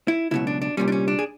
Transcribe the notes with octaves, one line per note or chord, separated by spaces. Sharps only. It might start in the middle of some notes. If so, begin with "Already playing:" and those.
E4
C#2 B2 F#3 E4
D4
D4
C2 A#2 G3 C#4
D4
C#4
D4
G#4